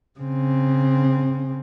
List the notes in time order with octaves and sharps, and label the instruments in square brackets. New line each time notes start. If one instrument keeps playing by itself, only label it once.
[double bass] C#3 C4